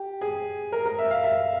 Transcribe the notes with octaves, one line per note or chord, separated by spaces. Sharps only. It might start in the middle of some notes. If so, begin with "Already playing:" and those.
Already playing: G4
G#4
A#4
A#4
E5
F5
E5